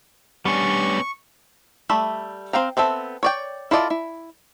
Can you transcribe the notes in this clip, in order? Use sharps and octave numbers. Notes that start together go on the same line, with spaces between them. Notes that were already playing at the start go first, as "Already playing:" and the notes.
G3 B3 C#4 D4 C#6
G3 A3 E5 B5
C4 F5 G5 A#5
B3 C4 A4 E5
C#5 D5 G5
E4 F4 A4 D5 D#5
E4